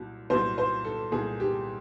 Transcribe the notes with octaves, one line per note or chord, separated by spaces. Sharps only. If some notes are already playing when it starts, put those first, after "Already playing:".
Already playing: C2 A#2 F#3
C2 A#2 F#3 C5
C5
A4
C2 A#2 F#3 G#4
G4